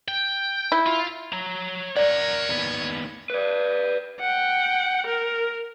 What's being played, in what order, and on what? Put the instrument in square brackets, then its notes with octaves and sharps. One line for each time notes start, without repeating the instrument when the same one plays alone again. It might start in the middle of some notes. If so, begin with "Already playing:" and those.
[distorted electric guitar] G5
[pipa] E4
[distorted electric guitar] F4
C#5 A#5
[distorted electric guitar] A#4 F#5 [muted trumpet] C#5 [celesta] D5
[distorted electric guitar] D#2 B3
[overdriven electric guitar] B4 D5
[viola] F#5 G5
A#4